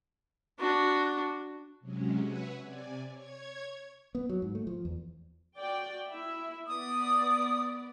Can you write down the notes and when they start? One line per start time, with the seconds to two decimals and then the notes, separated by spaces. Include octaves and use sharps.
0.59 D4 F#4
1.80 C3 F#3 G#3 C#4
2.20 B4 C#5 E5 F#5 G#5
2.62 C3 D5 G#5
3.12 C#5 G#6
4.15 B3
4.29 F#3
4.42 G#2
4.55 A3
4.67 F3
4.85 E2
5.57 F#4 D5 G5
6.08 E4 E5
6.68 B3 D5 D#6